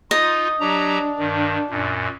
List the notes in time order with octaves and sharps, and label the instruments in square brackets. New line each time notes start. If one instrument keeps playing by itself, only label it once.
[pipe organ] D#4 F4 [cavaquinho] D#5
[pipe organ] F#3 G4 A#5 [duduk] D4
[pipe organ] G2 D#3
F#2 A#2